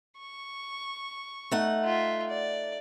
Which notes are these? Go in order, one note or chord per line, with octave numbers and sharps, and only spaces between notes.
C#6
A3 D#4 F#5
F4 E5
D5